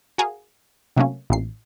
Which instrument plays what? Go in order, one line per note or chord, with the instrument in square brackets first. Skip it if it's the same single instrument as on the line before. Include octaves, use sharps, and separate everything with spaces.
[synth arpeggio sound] F#4 G#4 A#4 F5
C3 F#3 A3 A#3 C#4
A1 A#2 C7